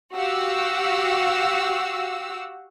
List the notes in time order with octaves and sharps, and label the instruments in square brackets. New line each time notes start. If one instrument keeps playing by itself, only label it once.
[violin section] F#4 G4 F5 F#5 E6